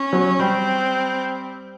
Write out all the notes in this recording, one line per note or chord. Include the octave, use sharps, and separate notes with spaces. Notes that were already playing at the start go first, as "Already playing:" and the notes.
Already playing: C#4
F#3
G3 C4